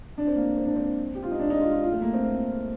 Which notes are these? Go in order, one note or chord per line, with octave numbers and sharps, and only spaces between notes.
D4
C4
A#3
C4
D4
C4
G4
F4
D#4
D4
D#4
F4
F4
F4
A3
A#3
C4
A#3